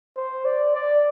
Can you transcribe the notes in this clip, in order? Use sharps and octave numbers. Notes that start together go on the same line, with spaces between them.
C5
D5
D5